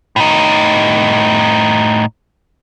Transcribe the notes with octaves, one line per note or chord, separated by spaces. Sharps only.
A2 D#4